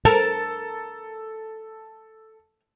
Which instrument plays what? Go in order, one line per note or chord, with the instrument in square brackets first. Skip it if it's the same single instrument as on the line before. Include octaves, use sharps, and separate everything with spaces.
[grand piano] A4 [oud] A#4 [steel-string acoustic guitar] A5